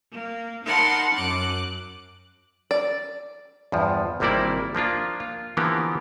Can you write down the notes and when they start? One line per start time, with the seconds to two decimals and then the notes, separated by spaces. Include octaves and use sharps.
0.12 A#3
0.64 D#4 A#4 F#5 A5 B5 C6
1.14 F#2 D6 F#6
2.71 D5
3.72 E2 G2 F3
4.20 G#1 C3 G3 A#3 E4 D5
4.75 F3 A#3 D4 F4
5.20 F4
5.57 D3 E3 F3 A#3 B3 G4